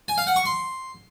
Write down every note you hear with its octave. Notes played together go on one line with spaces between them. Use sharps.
G#5
F5
F#5
C#6
C6